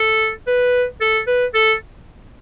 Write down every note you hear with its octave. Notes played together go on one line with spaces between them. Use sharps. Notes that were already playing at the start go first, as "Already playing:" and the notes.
Already playing: A4
B4
A4
B4
A4